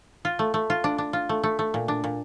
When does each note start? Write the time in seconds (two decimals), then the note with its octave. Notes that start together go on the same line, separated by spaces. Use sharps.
0.25 F4
0.39 A3
0.54 A3
0.70 F4
0.84 D4
0.98 D4
1.13 F4
1.29 A3
1.44 A3
1.59 A3
1.74 A#2
1.88 D4
2.04 A#2